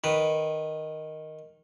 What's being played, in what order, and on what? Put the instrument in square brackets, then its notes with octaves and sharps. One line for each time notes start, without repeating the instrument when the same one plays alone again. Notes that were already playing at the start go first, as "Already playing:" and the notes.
[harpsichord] D#3 B4